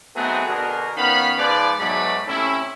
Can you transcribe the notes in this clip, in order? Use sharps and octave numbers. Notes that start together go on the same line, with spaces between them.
F#3 A3 B3 C4 D#4 G#4
B2 D3 F#4 G#4 A#4
D#3 B3 C#4 F5 B5
G#2 F3 B4 D5
G#2 B2 F#3 A3 D5 B5
A2 C3 C#4 E4